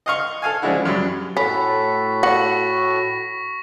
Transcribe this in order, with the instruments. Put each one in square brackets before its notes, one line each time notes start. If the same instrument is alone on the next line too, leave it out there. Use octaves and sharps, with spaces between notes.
[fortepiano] D#5 F5 C#6
A4 F5 G#5
C#3 F3 G#3 D4 E4 F#4
F#2 F#3 G3
[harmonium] A2 F#4 A4 [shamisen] C#4 [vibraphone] B5 [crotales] B6
[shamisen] F#5 [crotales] C#6 A#6